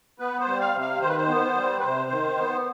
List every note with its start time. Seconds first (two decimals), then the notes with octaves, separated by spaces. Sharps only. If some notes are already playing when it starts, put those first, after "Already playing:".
0.19 B3 B4
0.40 C5
0.47 G3
0.60 F5
0.74 C3
0.80 F5
1.01 D#3 C5
1.09 B4
1.17 C5
1.29 B3
1.56 G3
1.79 B4
1.83 C3 C5
2.11 D#3
2.38 B3